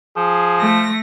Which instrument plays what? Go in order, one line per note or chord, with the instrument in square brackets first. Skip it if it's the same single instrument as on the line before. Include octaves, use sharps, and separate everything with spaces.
[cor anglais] F3 [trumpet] G#4
[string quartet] A3 A#6